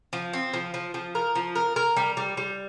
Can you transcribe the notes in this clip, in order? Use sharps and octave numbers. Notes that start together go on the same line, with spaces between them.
F3
C4
F3
F3
F3
A#4
F3
A#4
A#4
G3
G3
G3